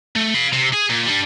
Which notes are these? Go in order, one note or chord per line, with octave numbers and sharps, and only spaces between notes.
A3
F5 B5
C3
G#4
A#2
G3 D4